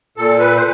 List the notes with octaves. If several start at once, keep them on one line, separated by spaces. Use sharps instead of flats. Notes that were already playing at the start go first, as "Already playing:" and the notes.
A#2 A4
B4
C5